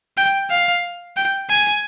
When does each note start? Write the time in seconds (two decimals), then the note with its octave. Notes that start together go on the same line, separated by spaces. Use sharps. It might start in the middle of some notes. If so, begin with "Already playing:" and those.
0.17 G5
0.51 F5
1.17 G5
1.50 G#5